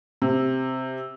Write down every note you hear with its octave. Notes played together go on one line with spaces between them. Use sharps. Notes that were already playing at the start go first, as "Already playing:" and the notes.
C3